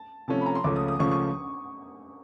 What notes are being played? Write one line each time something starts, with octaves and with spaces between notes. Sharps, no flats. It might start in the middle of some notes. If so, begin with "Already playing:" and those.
Already playing: A5
C3 F3 A3 C#4 A5
B5
A#5
C6
C#2 C#3 F3 A3 C#4 D6
D#6
D#6
C#2 C#3 F3 A3 C#4 C#6
C#6